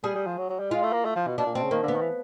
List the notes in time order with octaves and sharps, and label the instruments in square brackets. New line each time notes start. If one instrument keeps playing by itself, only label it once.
[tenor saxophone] G3 [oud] G#4
[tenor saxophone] G3
F3
F#3
F#3
G3
[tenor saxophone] G#3 [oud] F4
[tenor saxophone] A3
A#3
A3
F3
B2
[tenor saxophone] B2 [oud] D4
[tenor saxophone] A#2
[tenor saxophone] B2 [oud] C4
[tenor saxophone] C#3
[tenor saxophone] D#3 [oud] A#3
[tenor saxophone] D3
[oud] B3
[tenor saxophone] D#3
E3